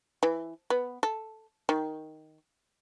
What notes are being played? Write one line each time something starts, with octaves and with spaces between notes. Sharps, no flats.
E3
B3
A4
D#3